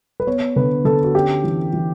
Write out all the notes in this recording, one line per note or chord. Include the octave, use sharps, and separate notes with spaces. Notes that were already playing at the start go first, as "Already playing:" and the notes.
B4
B3 C#5
D3 B4
D3 A4
F#4
C#4 G4
E3
E3